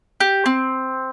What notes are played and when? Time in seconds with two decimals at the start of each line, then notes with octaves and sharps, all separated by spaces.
0.20 G4
0.46 C4